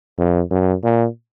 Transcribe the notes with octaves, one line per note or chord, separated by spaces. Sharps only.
F2
F#2
A#2